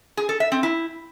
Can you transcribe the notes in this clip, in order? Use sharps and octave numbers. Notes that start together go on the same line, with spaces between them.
G#4
A4
E5
C4
E4